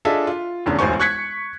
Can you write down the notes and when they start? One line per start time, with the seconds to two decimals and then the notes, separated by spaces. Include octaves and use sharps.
0.05 D4 F4 G#4 A4 D#5 E5
0.27 F4
0.66 F1 E2 D3 C#4
0.79 E1 A1 D2 C5 G#5 C#6
1.00 C#6 F#6 G#6 B6 C#7